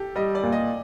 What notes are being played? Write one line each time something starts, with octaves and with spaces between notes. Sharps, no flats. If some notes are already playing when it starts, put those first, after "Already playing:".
Already playing: G4 A4
G3 D#5
D5
A#2
D#5